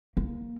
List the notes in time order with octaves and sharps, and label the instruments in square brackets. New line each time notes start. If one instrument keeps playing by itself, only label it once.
[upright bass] A#3